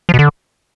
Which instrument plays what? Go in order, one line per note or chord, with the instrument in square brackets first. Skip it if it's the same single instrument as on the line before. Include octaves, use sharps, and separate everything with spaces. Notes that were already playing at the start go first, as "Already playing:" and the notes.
[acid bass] F3
B2
D3